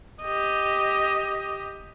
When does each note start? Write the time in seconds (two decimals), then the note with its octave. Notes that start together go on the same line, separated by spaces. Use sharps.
0.23 G4 D#5